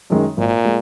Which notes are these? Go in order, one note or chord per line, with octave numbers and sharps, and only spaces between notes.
F#2 D#3 G#3
G#1 A#2
G#3